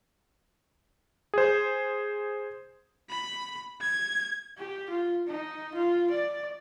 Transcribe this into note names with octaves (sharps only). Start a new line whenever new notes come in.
G#4 C5
B5
G#6
G4
F4
D#4
F4
D5